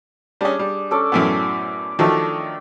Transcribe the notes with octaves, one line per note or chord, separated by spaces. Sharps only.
G3 C#4 D4 G#4
G3
C#4 A4 D5
F#2 A2 B3 G#5 D6
D#3 F3 F#3 A3 D4 E5